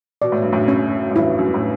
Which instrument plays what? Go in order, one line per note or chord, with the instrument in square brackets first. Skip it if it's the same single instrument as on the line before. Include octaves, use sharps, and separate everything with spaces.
[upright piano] B2 [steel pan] D5
[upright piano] A2
G2
F#2 A2
[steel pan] C#4
[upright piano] A2
[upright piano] E2 G2 [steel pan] E4
[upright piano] F#2
G2
A2